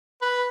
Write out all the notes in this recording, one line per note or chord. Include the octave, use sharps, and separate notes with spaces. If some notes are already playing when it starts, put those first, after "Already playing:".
B4